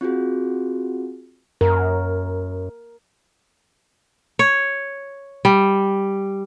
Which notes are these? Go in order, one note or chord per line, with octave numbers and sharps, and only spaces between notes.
C4 F4 F#4 G#4
F#2 A#4
C#5
G3